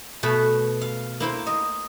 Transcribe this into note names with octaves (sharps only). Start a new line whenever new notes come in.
B2 A3 B4
F5
A#3 E4 C5
D#5